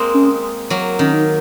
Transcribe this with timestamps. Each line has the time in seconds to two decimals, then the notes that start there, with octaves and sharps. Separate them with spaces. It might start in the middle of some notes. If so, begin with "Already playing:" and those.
Already playing: G#3 A#3 C4
0.14 C#4
0.70 F#3 A#3
0.99 D#3 C#4
1.13 D#4